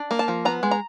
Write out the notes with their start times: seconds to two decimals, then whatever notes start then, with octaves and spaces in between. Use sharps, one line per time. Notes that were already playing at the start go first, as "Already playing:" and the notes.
Already playing: D4
0.11 A#3
0.19 A5
0.28 F3
0.45 B3 A#5
0.63 G#3
0.71 A#5